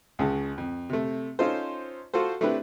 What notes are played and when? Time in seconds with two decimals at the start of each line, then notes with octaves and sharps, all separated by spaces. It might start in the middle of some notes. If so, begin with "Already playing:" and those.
0.19 C#2 C#3 G#3 A5
0.58 F2
0.90 C3 A3
1.39 C#4 D#4 F4 A4 C5
2.14 F4 F#4 A4 C5
2.41 A3 C4 D4 E4 G4 B4